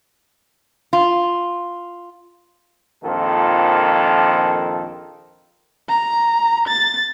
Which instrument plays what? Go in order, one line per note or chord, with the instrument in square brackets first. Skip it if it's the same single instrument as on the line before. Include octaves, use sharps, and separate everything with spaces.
[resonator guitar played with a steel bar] F4
[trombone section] A#1 F2 D#3 F4 A4
[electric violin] A#5
A6